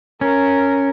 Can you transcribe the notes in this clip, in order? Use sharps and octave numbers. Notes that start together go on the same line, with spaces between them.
C#4 A#4